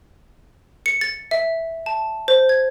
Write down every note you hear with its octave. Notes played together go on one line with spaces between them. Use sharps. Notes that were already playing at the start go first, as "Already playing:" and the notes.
C#7
A6
E5
A5
C5
G#6